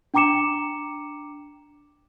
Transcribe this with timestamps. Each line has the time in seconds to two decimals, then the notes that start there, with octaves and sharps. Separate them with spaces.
0.14 D4 G5 A#5 D6 C#7 E7